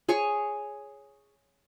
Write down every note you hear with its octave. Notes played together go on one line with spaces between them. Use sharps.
G#4 C#5 G#5 C#6